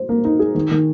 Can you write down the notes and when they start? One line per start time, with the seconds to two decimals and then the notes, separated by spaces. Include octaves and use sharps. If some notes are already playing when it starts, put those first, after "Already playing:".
Already playing: C5
0.09 A#3
0.25 D#4
0.39 G#4
0.55 D#3
0.71 D#3